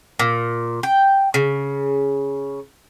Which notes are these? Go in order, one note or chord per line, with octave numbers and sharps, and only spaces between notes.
A#2
G5
C#3